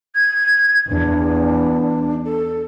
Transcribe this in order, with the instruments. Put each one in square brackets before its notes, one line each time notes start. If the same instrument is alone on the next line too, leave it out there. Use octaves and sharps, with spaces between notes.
[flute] G#6
[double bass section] E2 [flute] D4
[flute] A4